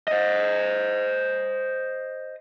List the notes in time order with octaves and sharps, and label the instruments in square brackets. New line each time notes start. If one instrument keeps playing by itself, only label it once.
[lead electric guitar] C5 D#5